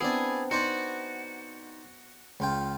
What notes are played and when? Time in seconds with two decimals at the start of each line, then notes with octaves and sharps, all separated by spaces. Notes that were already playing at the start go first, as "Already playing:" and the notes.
0.01 B3 C4 D4 E4 G#4 D5
0.51 B3 D#4 F#4 C5 D5
2.40 C#2 F4 G5